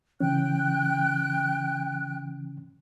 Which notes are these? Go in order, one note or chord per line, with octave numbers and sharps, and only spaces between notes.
C#3 E3 C#4 G5 F#6